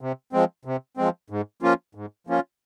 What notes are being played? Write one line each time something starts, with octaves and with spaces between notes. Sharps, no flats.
C3
F3 G#3 C4
C3
F3 G#3 C4
G#2
F3 A#3 C#4 F4
G#2
F3 A#3 C#4 F4